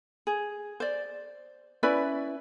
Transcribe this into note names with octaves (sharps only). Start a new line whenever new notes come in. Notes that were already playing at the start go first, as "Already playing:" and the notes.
G#4
C5 D5
C#4 E4 B4 D5